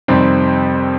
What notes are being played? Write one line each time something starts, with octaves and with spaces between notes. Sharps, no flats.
F2 C3 D#3 G3 C4